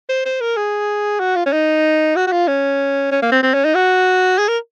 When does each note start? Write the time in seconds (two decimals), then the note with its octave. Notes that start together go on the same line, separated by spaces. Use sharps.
0.09 C5
0.25 C5
0.41 A#4
0.57 G#4
1.20 F#4
1.36 F4
1.46 C#4
1.53 D#4
2.16 F#4
2.27 F#4
2.32 F4
2.48 C#4
3.12 C#4
3.22 A#3
3.32 C4
3.43 C4
3.54 C#4
3.65 D#4
3.75 F#4
4.38 G#4
4.48 A#4